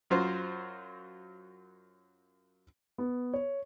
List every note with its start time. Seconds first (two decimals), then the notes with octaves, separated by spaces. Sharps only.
0.10 F#2 F#3 F4 C5
2.98 B3
3.34 C#5